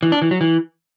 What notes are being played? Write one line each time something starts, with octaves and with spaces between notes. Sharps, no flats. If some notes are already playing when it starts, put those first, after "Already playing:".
E3
D4
E3
F#3
E3